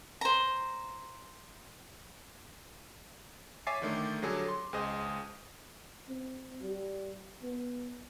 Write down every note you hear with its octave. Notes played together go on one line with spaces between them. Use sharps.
C5 A#5
C#5 E5 G#5 D6 A6 C7
D3 D#3 A3
D3 F#3 G3 G#4 A4
C6
C#2 G#4 C5 D#5 D#6
C4
G3
B3